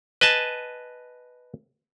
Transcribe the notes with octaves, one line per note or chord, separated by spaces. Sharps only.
B4 D#5 G#5 A5